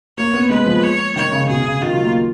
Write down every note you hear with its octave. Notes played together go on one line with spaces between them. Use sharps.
A#3 C#5
B3
G#3 B4
F3
C#5
D#3 C#5
C#3
B2 G#4
C#3
D#3 F4
F#3
A#3